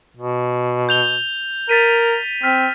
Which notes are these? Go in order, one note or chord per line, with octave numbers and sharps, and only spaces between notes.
B2
G6 F7 G7
A#4 A6 B6 D#7
C4 F6 B6